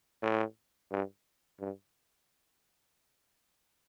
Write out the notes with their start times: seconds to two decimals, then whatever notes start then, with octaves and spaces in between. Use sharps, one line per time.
0.22 A2
0.91 G2
1.60 G2